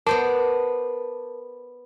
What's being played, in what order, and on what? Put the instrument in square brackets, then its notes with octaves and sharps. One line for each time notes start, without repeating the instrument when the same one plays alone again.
[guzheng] B3 C5 D5 [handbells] A#4 A5